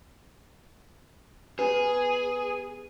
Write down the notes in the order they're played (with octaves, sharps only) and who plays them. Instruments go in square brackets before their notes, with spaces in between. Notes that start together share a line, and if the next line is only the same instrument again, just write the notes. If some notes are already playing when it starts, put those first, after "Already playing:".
[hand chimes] B3 B4 [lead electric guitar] G#4